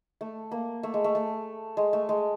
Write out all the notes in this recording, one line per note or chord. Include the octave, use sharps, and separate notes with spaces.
A3
A#3
A3
G#3
A3
A3
G#3
A3
G#3